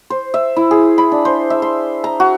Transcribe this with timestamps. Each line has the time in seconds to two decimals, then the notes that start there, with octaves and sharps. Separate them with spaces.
0.10 C5
0.34 E5
0.56 E4
0.71 G#4
0.98 B5
1.12 D4
1.25 C5
1.50 E5
1.62 C6
2.04 A#5
2.20 F#4